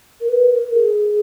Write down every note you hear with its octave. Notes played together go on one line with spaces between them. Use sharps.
A#4
B4
A#4
G#4